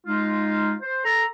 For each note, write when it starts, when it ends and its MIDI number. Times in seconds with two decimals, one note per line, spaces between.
0.07 0.74 56
0.07 0.74 63
0.07 0.74 65
0.81 1.02 72
1.03 1.25 69
1.03 1.25 82